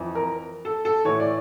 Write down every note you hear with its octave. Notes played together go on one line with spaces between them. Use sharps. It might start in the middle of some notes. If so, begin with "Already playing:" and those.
Already playing: F2 E3
A#4
A4
A4
A2 E3 C#5
D5